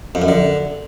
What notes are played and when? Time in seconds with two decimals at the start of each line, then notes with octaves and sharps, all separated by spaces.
0.15 F2
0.22 F#2
0.28 D3